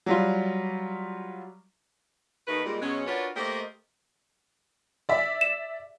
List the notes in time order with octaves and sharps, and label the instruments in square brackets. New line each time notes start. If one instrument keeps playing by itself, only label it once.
[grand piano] F#3 G3 F4
[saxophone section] D#2 D#3 A3 D#4 B4
A#2 G3 G#3
B2 F#3 G#3 C#4
D4 F4 F#4 A#4 B4 C#5
A3 A#3 G4 C5 D#5
[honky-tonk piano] D5 E5
[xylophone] E7